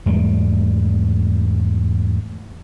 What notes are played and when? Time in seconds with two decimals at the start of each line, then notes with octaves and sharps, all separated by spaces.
0.06 E2 G#2 G3 A3